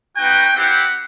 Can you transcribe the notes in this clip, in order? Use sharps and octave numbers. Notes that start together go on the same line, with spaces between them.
B3 D#4 F#4 G5
C4 E4 G4 F#5